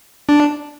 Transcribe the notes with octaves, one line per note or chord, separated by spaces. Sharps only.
D4